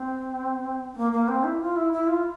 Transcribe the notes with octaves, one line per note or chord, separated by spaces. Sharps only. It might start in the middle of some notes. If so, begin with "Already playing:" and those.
Already playing: C4
C4
A#3
A#3
C4
E4
F4
E4
E4
F4